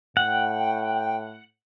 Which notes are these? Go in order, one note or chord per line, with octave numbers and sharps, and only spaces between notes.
A2 F#5 G5